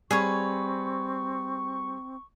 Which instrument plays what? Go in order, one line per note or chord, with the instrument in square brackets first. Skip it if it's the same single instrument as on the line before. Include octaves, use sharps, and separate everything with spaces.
[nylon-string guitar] G3 [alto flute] C4 [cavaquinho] G#4 B4 C#5 [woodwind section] C#6